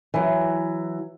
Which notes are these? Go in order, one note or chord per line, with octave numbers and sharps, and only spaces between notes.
E3 F#3